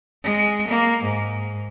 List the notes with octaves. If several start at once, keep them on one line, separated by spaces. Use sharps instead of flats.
G#3
A#3
G#2